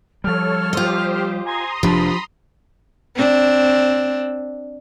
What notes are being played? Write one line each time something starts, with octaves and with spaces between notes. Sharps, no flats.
F3 G3 A4 C#5 F6
F4 G4 C5 D#5
G#5 A#5 C6 D#6
F1 F2 F3 D4 G4 B5
C4 D4